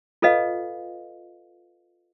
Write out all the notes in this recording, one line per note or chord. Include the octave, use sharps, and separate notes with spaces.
F4 A4 B4 D#5 F5